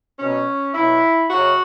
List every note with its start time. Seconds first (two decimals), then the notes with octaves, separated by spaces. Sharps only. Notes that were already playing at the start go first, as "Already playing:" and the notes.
0.19 B2 F#3 C#4
0.74 B2 F#3 E4
1.30 F#2 C#3 F#3 F#4